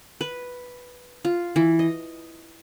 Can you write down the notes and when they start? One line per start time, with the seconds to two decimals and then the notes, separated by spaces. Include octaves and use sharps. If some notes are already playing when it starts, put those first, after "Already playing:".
0.21 B4
1.25 F4
1.56 E3
1.79 D#5